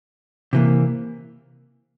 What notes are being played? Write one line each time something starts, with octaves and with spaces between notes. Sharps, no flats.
C3 E3 A#3